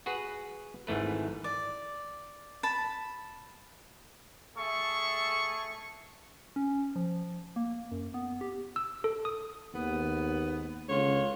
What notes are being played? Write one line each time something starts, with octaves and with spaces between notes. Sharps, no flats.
F#4 G#4 B4 F#5
G#1 G#2 E3 A3 B4
D5
A5 B5
A3 G#4 A4 E5 C#6
C#4
F3
A#3
F#2
B3
G4
E6
A4
D#6
D#2 G#2 B3
C#2 D3 F4 C#5